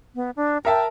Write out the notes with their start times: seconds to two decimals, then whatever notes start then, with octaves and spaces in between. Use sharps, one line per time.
0.15 B3
0.36 D4
0.65 A#4 E5 G5 A5